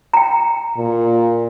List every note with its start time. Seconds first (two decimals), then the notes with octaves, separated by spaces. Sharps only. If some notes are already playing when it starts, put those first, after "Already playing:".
0.14 G5 A#5
0.78 A#2